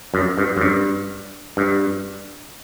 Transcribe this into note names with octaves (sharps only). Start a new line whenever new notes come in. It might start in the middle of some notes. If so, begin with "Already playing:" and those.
F#2
G2
F#2
G2
G2